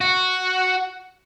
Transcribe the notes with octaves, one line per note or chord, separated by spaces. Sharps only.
F#4